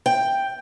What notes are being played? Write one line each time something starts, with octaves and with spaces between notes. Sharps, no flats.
G5